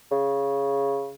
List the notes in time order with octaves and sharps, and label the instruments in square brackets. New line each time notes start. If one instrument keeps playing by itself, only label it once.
[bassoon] C#3